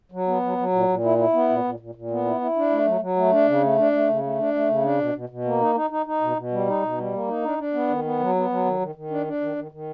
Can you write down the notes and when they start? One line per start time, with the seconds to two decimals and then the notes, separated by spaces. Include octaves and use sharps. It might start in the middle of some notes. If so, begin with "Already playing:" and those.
0.12 F#3
0.27 B3
0.42 F#3
0.58 F#3
0.72 A#2
0.88 A#2
1.03 E4
1.18 E4
1.33 B3
1.49 A#2
1.64 A#2
1.80 A#2
1.95 A#2
2.10 B3
2.25 E4
2.41 E4
2.56 D4
2.70 A3
2.86 F#3
3.01 F#3
3.16 A3
3.32 D4
3.47 C#3
3.62 A3
3.78 D4
3.92 A3
4.08 C#3
4.23 A3
4.38 D4
4.54 A3
4.69 C#3
4.84 D4
4.99 B2
5.15 B2
5.29 B2
5.45 A#3
5.61 D#4
5.75 D#4
5.90 D#4
6.06 D#4
6.21 B2
6.37 B2
6.51 G3
6.67 D#4
6.82 B2
6.98 G3
7.13 A#3
7.28 D#4
7.42 D4
7.58 D4
7.74 B3
7.88 D#3
8.04 B3
8.19 F#3
8.35 B3
8.50 F#3
8.65 D#3
8.80 D#3
8.95 D#3
9.11 D4
9.26 D4
9.41 D#3
9.56 D#3
9.71 D#3